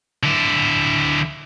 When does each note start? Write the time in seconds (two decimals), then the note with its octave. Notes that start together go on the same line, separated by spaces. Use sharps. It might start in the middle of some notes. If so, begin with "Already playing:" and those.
0.23 D3 E4